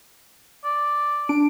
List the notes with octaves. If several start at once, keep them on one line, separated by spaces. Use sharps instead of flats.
D5
D4 D7